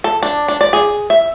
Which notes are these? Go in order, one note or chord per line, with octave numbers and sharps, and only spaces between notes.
A4
D4
D4
D5
G#4
E5